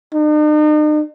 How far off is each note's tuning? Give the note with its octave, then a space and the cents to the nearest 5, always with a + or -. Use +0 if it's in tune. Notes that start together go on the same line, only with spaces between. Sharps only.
D#4 -45